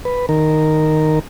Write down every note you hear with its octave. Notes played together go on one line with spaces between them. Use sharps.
B4
D#3 A#4